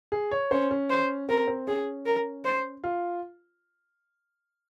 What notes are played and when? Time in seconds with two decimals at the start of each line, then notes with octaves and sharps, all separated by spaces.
0.12 G#4
0.31 C#5
0.51 C#4 C5
0.71 C#4
0.90 C5
1.29 C4 A#4
1.48 C4
1.67 C#4 G#4
2.06 A#4
2.45 C5
2.84 F4